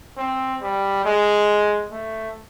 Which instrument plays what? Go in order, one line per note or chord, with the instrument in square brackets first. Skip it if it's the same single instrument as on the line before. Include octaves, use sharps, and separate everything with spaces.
[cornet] C4
G3
G#3
A3